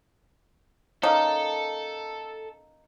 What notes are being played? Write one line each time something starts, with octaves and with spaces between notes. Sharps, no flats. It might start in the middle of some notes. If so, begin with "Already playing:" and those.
A#3 C#4 D#4 A4